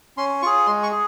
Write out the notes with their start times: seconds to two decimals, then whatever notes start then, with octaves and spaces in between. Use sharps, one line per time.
0.17 C#4 C6
0.42 F4 G#4 C#6
0.66 G#3 C6
0.83 C#6
0.92 G#4